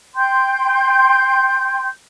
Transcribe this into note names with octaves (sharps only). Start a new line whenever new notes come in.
G5 C6 G6